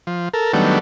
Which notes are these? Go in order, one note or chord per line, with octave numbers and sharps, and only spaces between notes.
F3
A4 A#4
D#3 F#3 G3 A3 B3 D4